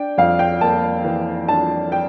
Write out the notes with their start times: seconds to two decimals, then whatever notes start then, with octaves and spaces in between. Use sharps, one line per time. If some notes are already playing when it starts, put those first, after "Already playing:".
Already playing: D4 G5
0.18 F2 F5
0.39 G5
0.61 A#3 A5
1.05 E3
1.48 D4 A5
1.92 G5